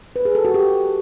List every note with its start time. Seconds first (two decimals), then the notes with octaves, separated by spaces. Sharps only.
0.16 B4
0.25 G#4
0.35 A4
0.45 F#4
0.54 G4